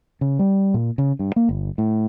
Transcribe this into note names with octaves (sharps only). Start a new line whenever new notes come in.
C#3
G3
A#2
C#3
G2
A#3
G1
A2